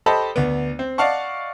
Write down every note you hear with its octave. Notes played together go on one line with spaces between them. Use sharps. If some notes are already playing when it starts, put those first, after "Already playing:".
G4 A4 C5 D#5 A5 B5
D2 B3
C4
D5 D#5 F5 F#5 A5 C#6